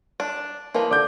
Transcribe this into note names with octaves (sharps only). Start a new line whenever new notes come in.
D4
E3 F3 A#3
D3 D6 G6